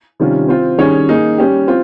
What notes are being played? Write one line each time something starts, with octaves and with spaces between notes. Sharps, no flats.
C3 D#3 G3 C#4 F4
C4 F4 C5
D#3 G3 C#4 G#4 C#5
A#3 D#4 G#4
G3 C#4 G4
C4 F4